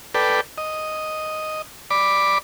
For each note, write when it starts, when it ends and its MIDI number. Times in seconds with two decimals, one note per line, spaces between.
0.15 0.41 69
0.15 0.41 71
0.15 0.41 74
0.15 0.41 79
0.58 1.62 75
1.91 2.38 74
1.91 2.38 83
1.91 2.38 86